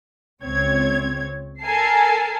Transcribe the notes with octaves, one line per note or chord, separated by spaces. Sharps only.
C#2 C4 C#5 G#6
A4 A#4 G#5 A5 C7